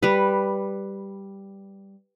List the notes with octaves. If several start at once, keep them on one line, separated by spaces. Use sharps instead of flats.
G3 B4